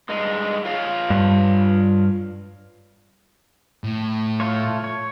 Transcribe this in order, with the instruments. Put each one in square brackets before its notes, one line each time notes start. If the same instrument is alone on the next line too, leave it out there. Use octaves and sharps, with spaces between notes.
[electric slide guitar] G2 G#3 D#4
F4 C#5 F5
[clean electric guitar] G2
[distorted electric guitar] A2
[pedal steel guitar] A3 F4 C#5
C#5